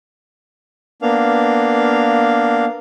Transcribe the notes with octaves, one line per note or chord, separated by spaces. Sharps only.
A#3 B3 D4 F5